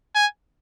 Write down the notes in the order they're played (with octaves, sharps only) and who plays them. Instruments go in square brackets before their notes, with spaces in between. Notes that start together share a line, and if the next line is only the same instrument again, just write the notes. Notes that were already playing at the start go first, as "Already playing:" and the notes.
[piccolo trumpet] G#5